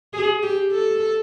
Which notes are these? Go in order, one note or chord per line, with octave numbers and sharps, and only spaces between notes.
G#4
G4
A4